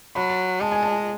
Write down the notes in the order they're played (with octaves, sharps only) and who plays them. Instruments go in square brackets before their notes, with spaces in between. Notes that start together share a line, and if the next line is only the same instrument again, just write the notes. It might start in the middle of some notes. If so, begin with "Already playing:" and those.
[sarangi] F#3 [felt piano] B5
[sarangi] G#3 [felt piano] A5
[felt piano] G#5
A5